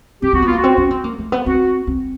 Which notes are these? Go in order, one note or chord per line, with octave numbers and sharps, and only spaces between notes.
C4 G4
C4 F#4
B3 F4
A#3
F#4
C4
C#4
C4
A#3
A3
B3
C4 F#4
C4